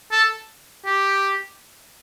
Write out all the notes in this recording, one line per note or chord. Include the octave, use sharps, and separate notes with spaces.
A4
G4